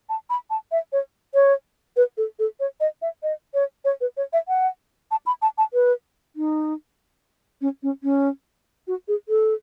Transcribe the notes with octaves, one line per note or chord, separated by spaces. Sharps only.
A5
B5
A5
E5
C#5
C#5
B4
A4
A4
C#5
D#5
E5
D#5
C#5
C#5
B4
C#5
E5
F#5
A5
B5
A5
A5
B4
D#4
C#4
C#4
C#4
F#4
G#4
A4